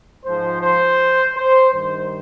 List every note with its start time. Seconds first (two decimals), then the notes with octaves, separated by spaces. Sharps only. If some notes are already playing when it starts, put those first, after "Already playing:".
0.24 G#2 F3 C5
0.62 C5
1.36 C5
1.73 G2 D#3 C5